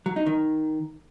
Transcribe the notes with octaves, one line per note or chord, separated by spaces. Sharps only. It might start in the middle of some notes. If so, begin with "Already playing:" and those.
F#3
D#4
D#3